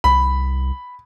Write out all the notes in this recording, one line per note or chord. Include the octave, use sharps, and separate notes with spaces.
C2 B5